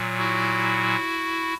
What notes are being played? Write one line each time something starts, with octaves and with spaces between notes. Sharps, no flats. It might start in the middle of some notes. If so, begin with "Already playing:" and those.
Already playing: A#2 F#3
E4 F#4